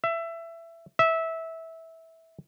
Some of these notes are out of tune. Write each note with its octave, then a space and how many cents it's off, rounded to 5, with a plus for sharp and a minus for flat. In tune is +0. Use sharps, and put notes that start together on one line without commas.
E5 +20
E5 -15